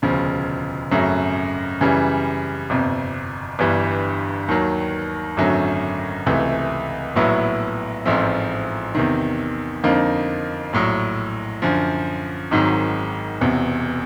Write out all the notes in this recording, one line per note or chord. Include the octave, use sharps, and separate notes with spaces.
E1 D2 C#3 F3
G#1 F#2 C#3 F#3 A3
F#2 C#3 E3 G3
G1 F2 C3
G1 G2 E3 G3
D#2 D#3 F#3
G#1 F#2 D3 F#3 A3
C#2 C3 E3 A3
A#1 A2 F#3 B3 E4
A1 G#2 F3 A3 C4
E2 C3 D#3
F2 D3 F3 A#3 D#4
A#1 A2 F#3
F#2 D3 F3
G#1 G#2 D#3 F#3
E1 E2 C3